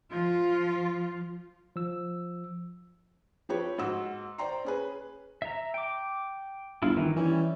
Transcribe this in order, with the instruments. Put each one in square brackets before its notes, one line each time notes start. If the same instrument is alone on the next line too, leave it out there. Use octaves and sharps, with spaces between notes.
[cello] F3 F4
[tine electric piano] F3 E6
[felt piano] F3 C4 G4 B4 C#5
G#2 F#4 E6
C5 D5 G5 A#5 C6
C#4 G#4 B4
[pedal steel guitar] E5 A#5
G5 D6
[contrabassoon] G1 [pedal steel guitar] E4 F4
[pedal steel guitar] D#3 E3
[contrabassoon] E3 [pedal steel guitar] G3 C#4